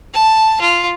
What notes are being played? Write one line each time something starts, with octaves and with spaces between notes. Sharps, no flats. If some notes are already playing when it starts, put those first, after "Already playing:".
A5
F4